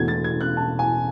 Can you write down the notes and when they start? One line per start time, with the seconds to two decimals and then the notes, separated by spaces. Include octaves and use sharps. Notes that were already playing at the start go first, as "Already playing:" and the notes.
Already playing: E1 E2 B2 A3 G#6
0.08 A6
0.24 G#6
0.41 F#6
0.57 A5
0.79 G#5